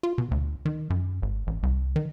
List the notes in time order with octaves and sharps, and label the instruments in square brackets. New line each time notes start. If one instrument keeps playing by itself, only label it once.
[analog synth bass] F4
B2
D2
D#3
F#2
G#1
A1
C2
D#3